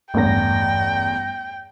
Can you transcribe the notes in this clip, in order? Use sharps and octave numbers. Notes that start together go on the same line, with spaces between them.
A1 E2 G2 G5 A#6